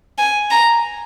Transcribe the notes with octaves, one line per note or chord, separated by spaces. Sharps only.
G#5
A#5